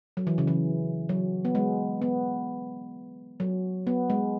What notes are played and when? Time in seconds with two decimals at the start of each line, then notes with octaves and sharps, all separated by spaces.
0.17 F#3
0.27 E3
0.38 C#3
0.47 E3
1.09 F#3
1.45 B3
1.55 G#3
2.02 B3
3.40 F#3
3.87 B3
4.10 G#3